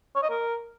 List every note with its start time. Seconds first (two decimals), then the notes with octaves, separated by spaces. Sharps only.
0.16 C#5
0.23 D#5
0.30 A#4